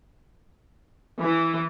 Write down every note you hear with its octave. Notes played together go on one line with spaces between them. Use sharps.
E3